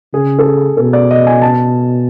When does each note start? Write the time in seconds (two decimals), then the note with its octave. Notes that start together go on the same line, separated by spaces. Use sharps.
0.13 C#3 G#4
0.39 A4
0.45 G#4
0.77 B2 A4
0.93 D5
1.11 D#5
1.27 G#5
1.42 A5